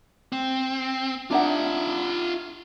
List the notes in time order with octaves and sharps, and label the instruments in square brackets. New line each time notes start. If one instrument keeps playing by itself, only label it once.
[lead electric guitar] C4
[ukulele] D4 D#4 F#5 [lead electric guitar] F4 E5